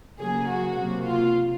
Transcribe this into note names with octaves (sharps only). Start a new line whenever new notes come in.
C#3 F#3 A#3 G#4
F#4
C3 F#3 A#3
F4